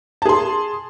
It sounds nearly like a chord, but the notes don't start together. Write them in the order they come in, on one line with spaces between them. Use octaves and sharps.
A5 G#4 C6